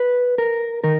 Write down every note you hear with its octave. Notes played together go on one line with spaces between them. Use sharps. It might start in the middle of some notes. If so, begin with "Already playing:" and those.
Already playing: B4
A#4
D#3 A#4